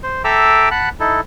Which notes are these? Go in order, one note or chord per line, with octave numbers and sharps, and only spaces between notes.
C5
A4 E5 G5 A#5 D6 E6
F#5 A5 B5 F#6
D#4 E4 A4